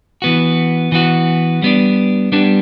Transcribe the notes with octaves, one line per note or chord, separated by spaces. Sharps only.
E3 B3 F#4
E3 B3 F#4
G3 B3 D4
G3 B3 D4